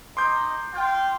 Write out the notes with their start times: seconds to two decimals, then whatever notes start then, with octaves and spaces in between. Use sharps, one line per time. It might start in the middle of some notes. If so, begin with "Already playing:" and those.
0.17 D#4 C6 D6 G6
0.73 F4 G5